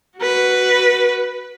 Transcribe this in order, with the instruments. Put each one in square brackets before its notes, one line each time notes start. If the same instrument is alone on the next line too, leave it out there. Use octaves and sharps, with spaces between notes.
[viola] F#4 B4